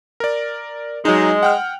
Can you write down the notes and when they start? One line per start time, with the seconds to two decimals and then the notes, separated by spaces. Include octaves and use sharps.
0.20 A#4 D5
1.05 F#3 G#3 D#4
1.43 F#5 G5 F6